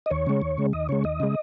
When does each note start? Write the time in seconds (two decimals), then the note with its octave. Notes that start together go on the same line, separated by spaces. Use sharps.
0.06 D#5
0.10 D#2 C#5
0.27 C#3 G#3
0.42 D#2
0.58 C#3 G#3
0.73 D#2 D#5
0.89 C#3 G#3 C#5
1.04 D#2 D#5
1.20 C#3 G#3